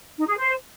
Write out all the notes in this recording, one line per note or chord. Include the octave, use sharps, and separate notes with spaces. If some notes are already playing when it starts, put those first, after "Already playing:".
D#4
G#4
C5